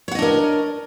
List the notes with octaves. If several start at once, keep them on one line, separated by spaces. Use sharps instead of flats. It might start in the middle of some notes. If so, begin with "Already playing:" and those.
D4 A#4 C#5 D#5 F#5